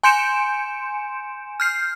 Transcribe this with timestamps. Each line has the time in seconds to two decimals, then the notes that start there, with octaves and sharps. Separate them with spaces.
0.03 G#5 C6 G6 C#7 D7 E7
1.60 F6 G6 C7